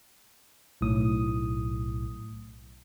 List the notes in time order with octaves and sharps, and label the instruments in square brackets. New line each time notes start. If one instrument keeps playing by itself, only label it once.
[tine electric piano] B1 A2 D#6